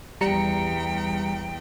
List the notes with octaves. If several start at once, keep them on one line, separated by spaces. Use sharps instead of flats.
E2 G3 G5 A#5 C#7